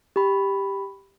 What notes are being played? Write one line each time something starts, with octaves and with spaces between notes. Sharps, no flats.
G4 B5